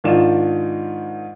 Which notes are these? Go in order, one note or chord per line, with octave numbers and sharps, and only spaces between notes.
G#2 D#3 D4 F4 E7